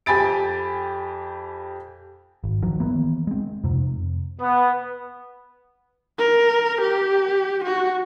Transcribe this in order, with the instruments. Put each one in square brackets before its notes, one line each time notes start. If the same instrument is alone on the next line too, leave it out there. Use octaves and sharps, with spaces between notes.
[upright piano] F2 G4 G#5 B5 A6 D7
[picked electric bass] G#1
D#3 F3 F#3
D#3 E3 A#3 B3
G#3 C4
F2 C3
[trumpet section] B3
[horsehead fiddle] A#4
G4
F#4